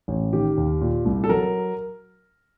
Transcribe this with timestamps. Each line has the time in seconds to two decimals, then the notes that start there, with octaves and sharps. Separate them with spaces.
0.08 A1
0.33 D#3 G4
0.57 D#2
0.81 A#2
1.06 C2
1.24 A4
1.29 F#3 A#4